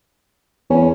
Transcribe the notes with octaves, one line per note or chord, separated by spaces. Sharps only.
E2 C#4